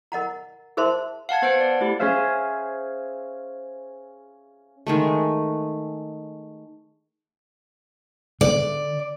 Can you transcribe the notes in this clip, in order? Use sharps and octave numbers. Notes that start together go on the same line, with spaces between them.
A#4 D#5 F#5 A#5
G#4 A#4 C5 E5 A5 C6
F5 F#5 A5 G#6
B3 C5 F#5 G#6 D7
D5
A3 E4 G4
C#4 G#4 C5 E5 F5
D#3 G#3 A3
D3 D5